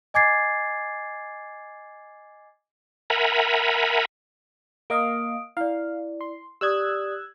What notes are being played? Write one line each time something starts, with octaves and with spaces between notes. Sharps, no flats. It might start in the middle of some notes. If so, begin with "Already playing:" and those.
D#5 G#5 D6 G#6 A6 C7
A#4 E5 F#5 G#5 A#5 B5
A#3 D#5 F5 D#6 D7
E4 D5 F5
C6
G4 D5 D#6 E6 F#6 G#6